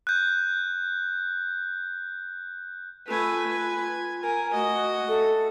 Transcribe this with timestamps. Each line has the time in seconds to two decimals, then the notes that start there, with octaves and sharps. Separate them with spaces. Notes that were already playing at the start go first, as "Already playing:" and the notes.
0.07 F#6 G6
3.08 A3 F4 B4 G#5
3.50 G#5
4.23 A#4 G#5
4.54 A3 F#4 D#5
5.08 A4 E5